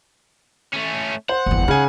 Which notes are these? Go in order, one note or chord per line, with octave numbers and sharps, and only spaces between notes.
A3 C#4
C5 F#5
G1 E2
C#3 D#4 G#5